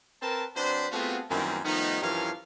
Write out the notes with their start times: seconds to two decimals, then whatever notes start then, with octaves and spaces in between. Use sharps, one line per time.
0.22 C4 A#4 B4 A5
0.55 F#3 C4 D4 B4 C5
0.91 A3 B3 C4 F4 F#4 G#4
1.30 F#2 D#3 E3 G3 A#3 C4
1.65 D#3 F3 A3 B3 D#4
2.02 G2 E3 F3 C#4 A#4 F5